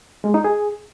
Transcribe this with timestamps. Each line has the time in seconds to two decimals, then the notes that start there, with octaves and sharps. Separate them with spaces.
0.24 G#3
0.34 D#4
0.44 G#4